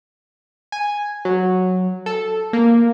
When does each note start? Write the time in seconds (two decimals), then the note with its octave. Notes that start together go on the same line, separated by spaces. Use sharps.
0.72 G#5
1.25 F#3
2.06 A4
2.53 A#3